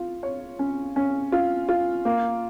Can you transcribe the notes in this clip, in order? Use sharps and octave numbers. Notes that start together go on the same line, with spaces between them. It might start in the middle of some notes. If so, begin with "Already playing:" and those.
Already playing: F4
C#5
C#4
C#4
F4
F4
A#3